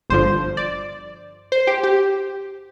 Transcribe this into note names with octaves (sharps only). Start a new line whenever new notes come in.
G1 G2 D3 F3 C5
D5
C5
G4
G4